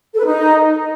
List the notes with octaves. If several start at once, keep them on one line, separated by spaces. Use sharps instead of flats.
A4
B4
D#4